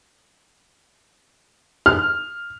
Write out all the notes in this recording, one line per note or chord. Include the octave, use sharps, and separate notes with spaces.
F6